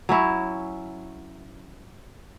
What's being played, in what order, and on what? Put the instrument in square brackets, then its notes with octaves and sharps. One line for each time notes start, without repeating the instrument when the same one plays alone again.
[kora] F#3 C#4 E4